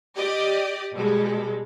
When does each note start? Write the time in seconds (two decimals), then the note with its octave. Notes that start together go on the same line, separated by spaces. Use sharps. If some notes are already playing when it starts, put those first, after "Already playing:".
0.17 G4 D5 D#5
0.94 B2 G3 G#3 A4